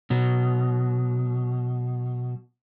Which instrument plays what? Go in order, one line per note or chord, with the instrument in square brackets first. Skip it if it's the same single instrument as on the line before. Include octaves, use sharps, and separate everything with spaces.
[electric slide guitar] B2 F#3